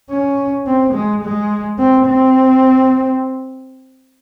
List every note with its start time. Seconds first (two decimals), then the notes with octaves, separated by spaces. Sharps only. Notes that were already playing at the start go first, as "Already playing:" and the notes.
0.10 C#4
0.67 C4
0.94 G#3
1.23 G#3
1.79 C4
2.07 C4